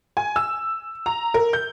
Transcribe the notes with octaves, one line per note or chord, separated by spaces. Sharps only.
G#5
E6
A#5
A#4
G6